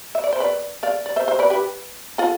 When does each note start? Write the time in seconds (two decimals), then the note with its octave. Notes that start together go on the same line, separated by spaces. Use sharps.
0.15 E5
0.24 D5
0.33 C5
0.40 B4 D5
0.83 D5 F5
1.06 D5
1.16 C5 E5
1.28 C5 E5
1.39 B4 D5
1.50 G4 B4
2.18 F4 A4